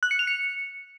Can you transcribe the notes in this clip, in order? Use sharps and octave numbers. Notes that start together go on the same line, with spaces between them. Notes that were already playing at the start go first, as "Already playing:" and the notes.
F#6
C#7
F7
C#7